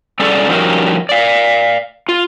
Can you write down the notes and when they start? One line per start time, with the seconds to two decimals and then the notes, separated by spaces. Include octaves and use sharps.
0.20 G3 C#4 G#4 A4 D5
0.49 F3 G3 C#4 D#4 F#4 A#4
1.09 D5 F5
2.09 F4